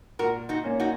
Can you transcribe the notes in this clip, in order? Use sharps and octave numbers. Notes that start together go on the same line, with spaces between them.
A#2 F#4 A#4
D#4 F#4
A#3 C#4
D#4 F#4